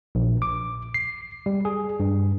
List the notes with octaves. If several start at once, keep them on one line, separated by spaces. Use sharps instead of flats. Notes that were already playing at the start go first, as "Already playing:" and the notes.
A#1
D6
C7
G3
G#4
G2